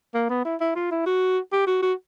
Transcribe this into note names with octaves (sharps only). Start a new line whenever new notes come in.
A#3
B3
E4
E4
F4
E4
F#4
G4
F#4
F#4